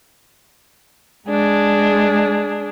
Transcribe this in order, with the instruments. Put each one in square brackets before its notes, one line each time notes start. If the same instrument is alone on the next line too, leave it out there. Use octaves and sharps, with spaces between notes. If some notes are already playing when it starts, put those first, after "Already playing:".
[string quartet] G#3 D4 G#4